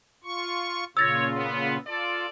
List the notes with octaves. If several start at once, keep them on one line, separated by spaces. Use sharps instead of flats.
F4 C#6
A#2 C#3 F4 C#5 E6 A6 A#6
B3
F4 A4 D5